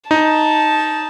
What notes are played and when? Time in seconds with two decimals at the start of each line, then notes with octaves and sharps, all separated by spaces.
0.11 D#4 A5